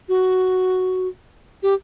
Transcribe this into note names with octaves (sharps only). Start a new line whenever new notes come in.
F#4
G4